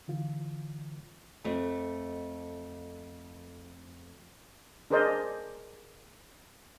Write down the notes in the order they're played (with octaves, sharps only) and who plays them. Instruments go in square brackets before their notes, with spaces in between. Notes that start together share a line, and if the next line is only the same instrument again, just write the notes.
[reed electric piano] D3 E3 F4
[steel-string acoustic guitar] F2 A3
[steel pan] D4 G#4 A#4 C5 D5 D#5